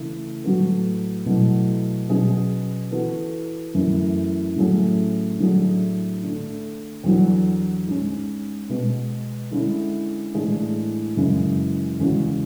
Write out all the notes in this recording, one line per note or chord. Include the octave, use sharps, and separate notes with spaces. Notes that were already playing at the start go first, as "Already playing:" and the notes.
Already playing: C#3 E3 A3
A2 F#3 B3 F#4 A4
B2 F#3 A3 E4
B2 F#3 C#4 G#4
E3 B3 F#4 A4
F#2 E3 A3 C#4 E4
A2 F#3 A3 C#4 G#4
A2 F#3 A3 D4 G#4
D3 A3 D4
E2 D3 F#3
G#2 G#3 C#4
B2 G#3 B3
D3 G#3 C#4 E4
A2 E3 G#3 D4 G#4
F#2 C#3 E3 G#3 C#4
E2 C#3 G#3 C#4 F#4